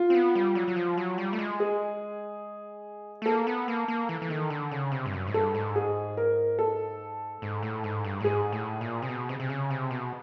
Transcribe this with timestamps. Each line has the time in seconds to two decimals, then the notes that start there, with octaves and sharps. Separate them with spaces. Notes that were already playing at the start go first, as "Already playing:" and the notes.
Already playing: F4
0.10 C4
0.15 B3
0.35 G3
0.55 F#3
0.68 F#3
0.76 F3
0.97 F#3
1.18 G3
1.33 A3
1.39 G#3
1.60 G#4
3.22 A3
3.26 A#3 A4
3.47 B3
3.68 A#3
3.88 A#3
4.09 E3
4.22 E3
4.30 D#3
4.50 D3
4.72 C#3
4.92 C3
5.06 G2
5.13 F#2
5.27 G#2
5.34 G2 A4
5.54 G#2
5.76 G#4
6.17 A#4
6.59 A4
7.42 G#2
7.63 A2
7.84 G#2
8.05 G2
8.21 A2
8.24 G#2 G#4
8.52 A2
8.81 A#2
9.02 C3
9.08 B2
9.29 C3
9.40 C3
9.49 C#3
9.70 C3
9.91 B2